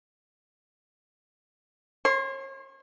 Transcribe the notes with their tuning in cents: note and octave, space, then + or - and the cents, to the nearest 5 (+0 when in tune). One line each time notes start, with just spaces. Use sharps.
C#5 -40 C6 +0